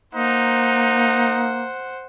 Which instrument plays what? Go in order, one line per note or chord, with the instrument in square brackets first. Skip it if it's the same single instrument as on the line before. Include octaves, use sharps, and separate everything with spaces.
[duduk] A#3 [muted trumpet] D#4 [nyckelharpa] C5 F#5